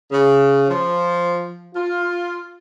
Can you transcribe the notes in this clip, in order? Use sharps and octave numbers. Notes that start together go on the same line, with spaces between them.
C#3
F3
F4